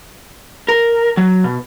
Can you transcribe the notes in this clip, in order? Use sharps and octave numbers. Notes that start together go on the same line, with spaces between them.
A#4
F#3
B2